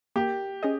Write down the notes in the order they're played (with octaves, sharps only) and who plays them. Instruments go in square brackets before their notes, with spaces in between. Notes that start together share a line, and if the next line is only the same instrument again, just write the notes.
[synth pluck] A#3 [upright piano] G4
[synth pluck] C#4 G#4 D#5